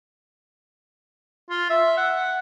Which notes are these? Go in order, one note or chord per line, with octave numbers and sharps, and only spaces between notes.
F4
E5
F#5
F#5